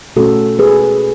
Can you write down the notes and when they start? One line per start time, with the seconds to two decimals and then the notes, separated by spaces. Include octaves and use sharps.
0.16 B2 A3 C#4 F#4 A4
0.59 G#4 B4